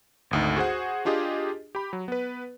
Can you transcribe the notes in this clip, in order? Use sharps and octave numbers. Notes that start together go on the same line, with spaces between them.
G#1 D2 D#4
F#4 G#4 C5 F#5
D4 F4 G4 G#4 D#5
G4 B5
F#3
B3 B4